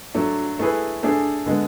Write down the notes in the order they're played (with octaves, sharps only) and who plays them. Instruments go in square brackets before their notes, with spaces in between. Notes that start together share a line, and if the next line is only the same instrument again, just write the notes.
[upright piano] F#3 A3 D4
A3 E4 G#4 B4
A3 D4 G#4
D3 G#3 B3